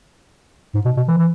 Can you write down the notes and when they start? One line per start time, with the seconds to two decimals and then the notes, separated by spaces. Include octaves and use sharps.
0.74 G#2
0.85 B2
0.97 B2
1.08 E3
1.18 E3